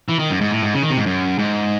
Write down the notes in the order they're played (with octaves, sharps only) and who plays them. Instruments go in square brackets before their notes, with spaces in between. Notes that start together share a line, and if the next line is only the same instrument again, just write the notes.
[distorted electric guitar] E3
D#3
F#2
G#2
A2
G#2
C#3
D#3
C3
G#2
F#2
G#2